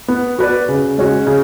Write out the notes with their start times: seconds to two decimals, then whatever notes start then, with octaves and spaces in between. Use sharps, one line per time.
0.08 B3
0.39 F#4 B4 D5
0.69 C#3
0.97 G#3 C#4 F#4
1.27 C#3